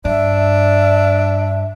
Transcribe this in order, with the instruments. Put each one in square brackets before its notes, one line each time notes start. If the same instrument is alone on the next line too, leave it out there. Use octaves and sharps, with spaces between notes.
[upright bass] G2 [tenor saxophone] D4 [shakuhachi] E5